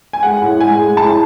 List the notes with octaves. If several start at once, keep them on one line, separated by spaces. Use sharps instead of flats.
G#5
G#3 F#5
A2
G#3 G#5
G#3
A2 A5